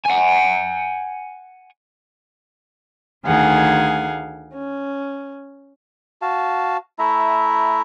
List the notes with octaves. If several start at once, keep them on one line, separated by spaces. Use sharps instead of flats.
F#5 G#5
D2 D#3 G#4 F5 F#5 G#5
C#4
F#4 F5 A5
A3 E4 E5 A#5